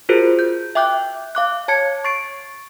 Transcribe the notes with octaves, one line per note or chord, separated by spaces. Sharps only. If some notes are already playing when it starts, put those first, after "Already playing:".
F4 F#4 G#4 A#4 C5
G6
E5 G5 D6 F#6 G6
F5 D6 F#6
C#5 A5 G#6 C#7
C#6 A6 C7 D7